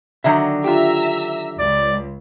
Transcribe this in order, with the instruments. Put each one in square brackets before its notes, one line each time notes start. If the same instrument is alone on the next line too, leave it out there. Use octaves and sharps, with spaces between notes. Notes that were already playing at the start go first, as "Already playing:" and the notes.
[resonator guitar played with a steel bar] D3 D#3 F#3 [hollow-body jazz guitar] E5
[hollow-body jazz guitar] F4 G4 [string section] E5 A#5 E6
[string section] C#2 [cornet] D5